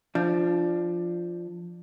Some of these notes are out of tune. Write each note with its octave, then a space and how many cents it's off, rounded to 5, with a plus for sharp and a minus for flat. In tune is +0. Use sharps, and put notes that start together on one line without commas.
F3 -5 D4 +15